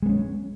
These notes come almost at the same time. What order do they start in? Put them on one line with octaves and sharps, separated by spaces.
G#3 B3 C#4